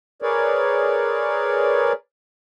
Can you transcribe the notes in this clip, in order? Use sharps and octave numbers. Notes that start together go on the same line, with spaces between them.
G#4 A#4 B4 C#5 D5